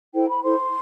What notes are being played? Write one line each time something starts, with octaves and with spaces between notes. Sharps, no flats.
E4 A4 C5 G5
B5
E4 A4 C5 C6